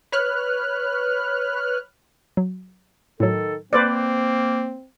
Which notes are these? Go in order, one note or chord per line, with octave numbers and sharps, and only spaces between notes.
B4 C#5 F6 F#6
F#3
A2 D#3 F#3 A4
A#3 C4 B4 C5 D5